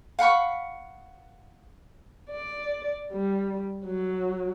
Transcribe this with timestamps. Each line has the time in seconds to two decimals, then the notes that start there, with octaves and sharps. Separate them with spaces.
0.19 F5 F#5 B5 C#6
2.31 D5
3.13 G3
3.86 F#3